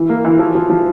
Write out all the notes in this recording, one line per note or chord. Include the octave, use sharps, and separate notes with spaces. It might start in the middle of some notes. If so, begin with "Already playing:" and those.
Already playing: E3
A#3
E3
F3
F3
F3